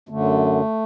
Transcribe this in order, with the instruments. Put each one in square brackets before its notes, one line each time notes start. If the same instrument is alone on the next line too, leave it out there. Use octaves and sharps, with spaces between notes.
[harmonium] F#2 D3 A3